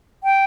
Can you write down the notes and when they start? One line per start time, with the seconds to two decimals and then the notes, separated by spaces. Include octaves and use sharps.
0.24 G5